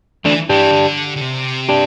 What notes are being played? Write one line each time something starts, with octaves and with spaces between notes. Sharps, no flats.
E3 A3 D4
E3 D4 G4
D3
D3
C3
D4 G4